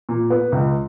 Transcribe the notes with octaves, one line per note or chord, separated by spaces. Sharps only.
A#2
B3
C#2